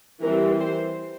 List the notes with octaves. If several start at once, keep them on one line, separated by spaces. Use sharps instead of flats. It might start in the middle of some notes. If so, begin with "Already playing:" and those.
E3 G3 C4 A#4
C5